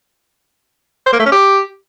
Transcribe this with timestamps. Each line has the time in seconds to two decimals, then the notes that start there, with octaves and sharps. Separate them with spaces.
1.06 C5
1.13 A#3
1.19 A3
1.26 C#4
1.32 G4